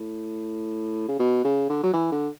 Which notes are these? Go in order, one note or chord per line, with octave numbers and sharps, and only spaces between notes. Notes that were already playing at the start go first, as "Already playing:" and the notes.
Already playing: A2
C#3
B2
C#3
D3
F#3
E3
D3